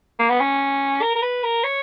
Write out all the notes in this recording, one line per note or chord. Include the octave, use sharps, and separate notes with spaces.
A#3
B3
C#4
A#4
A#4
B4
A#4
C#5